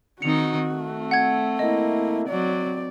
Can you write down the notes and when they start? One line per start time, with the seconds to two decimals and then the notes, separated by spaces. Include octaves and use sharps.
0.22 D#3 C4 D#4 F#4 C#7 F7
0.74 A3 C4
1.11 F#5 G#6
1.59 A#3 E4 D#5
2.29 F#3 C4 D5